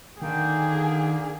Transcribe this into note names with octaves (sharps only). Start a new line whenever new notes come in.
D3 D#3 A#3 G#4 G5